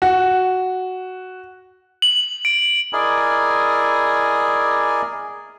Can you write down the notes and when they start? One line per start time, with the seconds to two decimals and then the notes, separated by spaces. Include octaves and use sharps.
0.02 F#4
2.02 F#7
2.45 D7
2.93 E4 G#4 A#4 D5 D#5 G#5